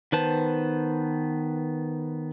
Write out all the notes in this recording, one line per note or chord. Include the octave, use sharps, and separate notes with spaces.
D#3 B3 B4 C5 A5